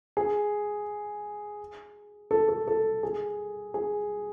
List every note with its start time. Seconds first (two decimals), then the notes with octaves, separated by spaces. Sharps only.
0.17 G#4
2.31 A4
2.49 A4
2.68 A4
3.03 G#4
3.74 G#4